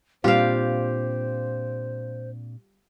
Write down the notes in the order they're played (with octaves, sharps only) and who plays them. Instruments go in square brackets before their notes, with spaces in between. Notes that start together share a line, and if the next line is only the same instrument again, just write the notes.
[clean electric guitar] A#2 C4 D4 [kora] G3 F4 [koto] G4 F5 [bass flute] C5